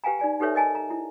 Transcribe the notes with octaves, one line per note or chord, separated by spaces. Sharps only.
G4 B4 F5 G5 G#5 A#5
D#4 D5 G#5
D#4 G4 A4 B4 C#5 E5
A#4 D#5 G#5 A5
A#5
E4